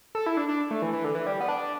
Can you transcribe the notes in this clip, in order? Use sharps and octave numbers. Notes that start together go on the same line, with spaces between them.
A4
E4
D4
D4
A3
E3
E3
D3
E3
G3
B3
D4